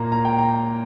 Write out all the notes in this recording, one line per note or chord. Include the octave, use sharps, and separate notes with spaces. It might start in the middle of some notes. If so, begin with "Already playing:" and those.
Already playing: A#2 A#3 A#5
A#5
G5
A#5